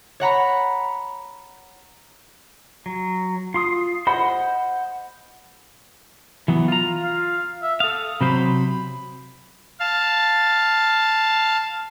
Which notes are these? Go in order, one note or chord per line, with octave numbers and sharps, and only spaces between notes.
C#5 F#5 A#5 B5
F#3
F4 C6 D#6
C5 D#5 F#5 B5
E3 F#3 B3
F4 A#5
F5
E5
A4 F5 D#6
C3 F#3 C5 B5
F5 A5